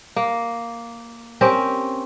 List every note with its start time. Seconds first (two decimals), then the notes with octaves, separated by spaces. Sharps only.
0.16 A#3
1.41 C4 C#4 G4 A#4